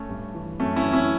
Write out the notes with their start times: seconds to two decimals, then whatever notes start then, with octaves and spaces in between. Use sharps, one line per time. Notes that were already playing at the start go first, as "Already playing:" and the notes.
Already playing: A3 C#4
0.09 G2
0.34 E3
0.60 F#2 A3 C#4
0.76 C#4 E4
0.85 E3
0.93 C#4 E4